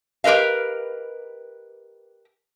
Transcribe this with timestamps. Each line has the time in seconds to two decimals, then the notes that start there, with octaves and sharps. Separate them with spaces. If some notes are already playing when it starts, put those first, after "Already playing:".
0.24 G4 A#4 B4 D#5 F5